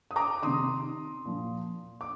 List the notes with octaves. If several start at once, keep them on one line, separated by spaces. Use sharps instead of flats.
D#6
A#5 D6
C3 D#3 C6 D#6
A#2 F3
D6